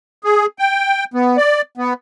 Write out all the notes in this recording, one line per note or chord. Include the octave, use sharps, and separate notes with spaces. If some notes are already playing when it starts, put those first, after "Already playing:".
G#4
G5
B3
D5
B3